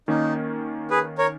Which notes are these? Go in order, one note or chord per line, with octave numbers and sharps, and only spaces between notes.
D#3 A#3 C#4 D#4
G#4 B4
A#4 C#5